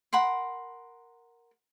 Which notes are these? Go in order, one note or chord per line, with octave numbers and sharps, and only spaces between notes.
A#4 F#5 B5 C6